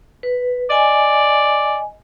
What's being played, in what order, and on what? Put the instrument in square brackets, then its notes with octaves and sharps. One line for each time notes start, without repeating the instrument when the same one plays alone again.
[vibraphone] B4
[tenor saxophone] D5 [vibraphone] D#5 G#5